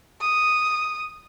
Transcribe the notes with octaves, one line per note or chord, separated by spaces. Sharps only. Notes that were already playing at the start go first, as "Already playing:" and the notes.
D#6